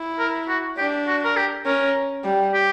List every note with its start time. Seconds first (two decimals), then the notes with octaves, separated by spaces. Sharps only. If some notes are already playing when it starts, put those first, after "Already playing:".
Already playing: E4
0.19 A#4
0.49 F#4
0.78 D4 G4
1.07 F#4
1.25 A#4
1.37 G4
1.66 C#4 A#4
2.24 G3
2.54 G4